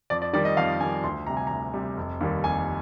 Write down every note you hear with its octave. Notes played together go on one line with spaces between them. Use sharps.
F2 D5
D5
D#3 G3 D5
D#5
F2 F5
D#3 G3 G#5
D2 C6
C3 G3 A#5
G#5
D2 A#5
C3 G3
F1
D#2 D#3 G3
F1 G#5